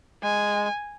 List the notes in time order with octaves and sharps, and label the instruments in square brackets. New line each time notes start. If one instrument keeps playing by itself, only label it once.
[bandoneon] G#3 [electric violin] G#5